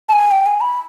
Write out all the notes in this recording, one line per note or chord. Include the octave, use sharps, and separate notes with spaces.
A5
G#5
G5
G#5
B5